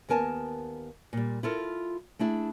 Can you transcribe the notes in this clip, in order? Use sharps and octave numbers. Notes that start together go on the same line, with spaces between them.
D#2 B3 A#4 G#5 A5
A#2 G3
E4 F4 A4 A#4
A3 D4 E4 G#4